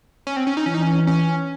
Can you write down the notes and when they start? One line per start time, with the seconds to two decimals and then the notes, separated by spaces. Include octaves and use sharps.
0.27 C#4
0.37 C4
0.47 C#4
0.57 D#4
0.66 E3 C#4
0.74 D#4
0.82 C#4
1.07 C#4